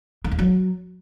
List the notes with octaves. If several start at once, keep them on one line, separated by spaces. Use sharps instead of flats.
D#3
E2
F#3